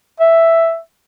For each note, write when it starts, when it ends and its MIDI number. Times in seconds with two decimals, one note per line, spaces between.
0.20 0.78 76